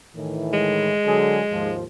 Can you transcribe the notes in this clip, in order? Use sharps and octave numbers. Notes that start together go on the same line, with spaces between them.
A2 D#3 E3
G#3
D3 F#3 G#4
D#2 G#2 F3